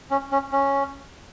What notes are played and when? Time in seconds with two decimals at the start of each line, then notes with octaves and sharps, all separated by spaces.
0.11 C#4
0.32 C#4
0.52 C#4